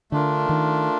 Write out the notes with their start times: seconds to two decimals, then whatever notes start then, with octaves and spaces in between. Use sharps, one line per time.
0.11 D3 A3 D4 F4 A#4
0.49 D#3